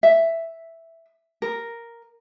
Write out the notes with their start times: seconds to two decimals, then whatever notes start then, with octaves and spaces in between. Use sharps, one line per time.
0.03 E5
1.42 A#4